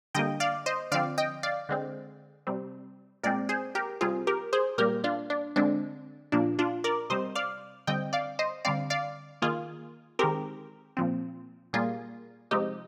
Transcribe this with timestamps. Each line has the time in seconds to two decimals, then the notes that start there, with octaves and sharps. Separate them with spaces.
0.15 D3 G3 A#3 D#5 G5
0.40 D5 F5
0.66 C5 D#5
0.92 D3 F3 C4 D5 F5
1.18 D#5 G5
1.43 D5 F5
1.69 D3 G#3 C4
2.47 C3 G3 C4
3.24 A#2 G#3 C4 A#4 D5
3.49 G#4 C5
3.75 G4 A#4
4.01 C3 G3 C4 F4 G#4
4.27 G4 A#4
4.53 G#4 C5
4.78 A#2 G3 A#3 G4 A#4
5.04 D4 F4
5.30 D4
5.56 D3 G#3 C4 D4
6.32 A#2 F3 A#3 D4
6.59 D4 F4
6.84 A#4 D5
7.10 C3 G3 C4 C5 D#5
7.35 D5 F5
7.87 D3 G3 C4 D#5 G5
8.13 D5 F5
8.39 C5 D#5
8.65 D3 G3 C4 D5 F5
8.90 D5 F5
9.42 D#3 A#3 F4 G#4
10.19 D#3 G#3 C4 G4 A#4
10.97 A#2 F3 C4
11.73 A#2 G3 A#3 F4 G#4
12.51 C3 F3 G#3 C4 D#4 G4